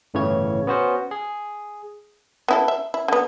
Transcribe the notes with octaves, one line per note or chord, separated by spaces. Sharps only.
G1 A2 C#3 E3 C#5 G#6
B3 C#4 F#4 C5 F#5
G#4
B3 E4 A4
E5
E4
D3 B3